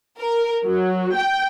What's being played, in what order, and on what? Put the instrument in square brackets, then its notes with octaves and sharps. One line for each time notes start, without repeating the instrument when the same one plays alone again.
[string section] A#4
F#3
G5